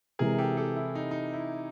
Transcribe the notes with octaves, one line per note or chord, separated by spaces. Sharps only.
C3 E3 G#3 G#4 A#4
G4 A4
G4 A4
E4
D#4
D#4
E4